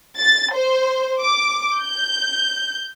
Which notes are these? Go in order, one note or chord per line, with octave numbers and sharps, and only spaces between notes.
A6
C5
D6
G6